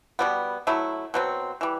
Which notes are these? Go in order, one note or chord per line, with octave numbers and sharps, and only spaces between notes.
B2 G3 B3
F#3 A3 E4
B2 F#3 C4
E3 G3